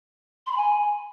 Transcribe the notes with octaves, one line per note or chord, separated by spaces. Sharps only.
C6
B5
G#5